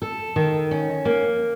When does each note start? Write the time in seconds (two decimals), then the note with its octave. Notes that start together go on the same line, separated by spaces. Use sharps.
0.02 A4
0.36 D#3
0.71 C#4
1.05 A#3